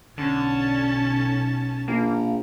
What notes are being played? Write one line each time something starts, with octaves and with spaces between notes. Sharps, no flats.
B1 D3 C#4 A5
A#1 A#3